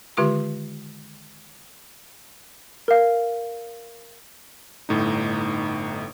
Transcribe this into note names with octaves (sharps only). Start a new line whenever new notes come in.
D3 D#3 G#3 F4 G4 C#6
A#4 F5
G1 A2 D#4